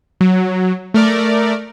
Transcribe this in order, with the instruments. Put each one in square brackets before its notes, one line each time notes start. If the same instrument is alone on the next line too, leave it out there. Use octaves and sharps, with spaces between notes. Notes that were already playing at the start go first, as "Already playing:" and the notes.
[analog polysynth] F#3
A3 A#4 D5